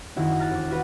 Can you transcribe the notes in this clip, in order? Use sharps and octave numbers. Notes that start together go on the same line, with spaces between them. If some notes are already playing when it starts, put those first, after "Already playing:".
F#1 D#3 E4 F#4
A#5 F6 F#6 A6
E1 D6
F4 F#4 B4 F#5